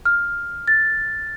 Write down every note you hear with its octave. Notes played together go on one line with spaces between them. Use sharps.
F6
A6